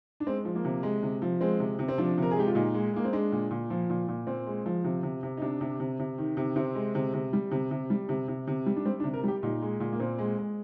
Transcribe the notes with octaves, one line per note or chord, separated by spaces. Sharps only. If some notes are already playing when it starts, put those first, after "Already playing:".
D4
G#3 C4
F3
A#3
C3
G#3
C3
F3
G#3 C4
C3
C3
C4
F3 D4
C3 A#4
G#4
G#3 G4
F4
A#2 D#4
G#3
G#3 A#3
C4
G#3 D4
A#2
A#2
F3
A#2
A#2
A#2 C4
G#3
F3
C3
C3
C3
D#4
C3 D4
C3
C3
C3
D#3
C3
C3 C4
G#3
C3
C3
G3
C3
C3
G3
C3
C3
C3
G3
D4
G3 C4
D4
C3
A#4
G3 G4
A#2 D#4
G#3
A#2
A#3
A#2 C4
G#3
G#3